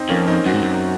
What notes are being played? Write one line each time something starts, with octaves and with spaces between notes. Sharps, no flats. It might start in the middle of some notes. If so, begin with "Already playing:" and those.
Already playing: C4 D#4
F2 A#3 C#4
C4 D#4
F#2 D#4 F#4
G#2
F#2